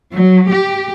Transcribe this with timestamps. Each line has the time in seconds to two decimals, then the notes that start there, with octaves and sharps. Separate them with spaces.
0.13 F#3
0.49 G4